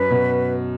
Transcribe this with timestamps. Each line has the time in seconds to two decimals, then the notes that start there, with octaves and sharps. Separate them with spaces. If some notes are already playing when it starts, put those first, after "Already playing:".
Already playing: F#2 B4
0.10 B2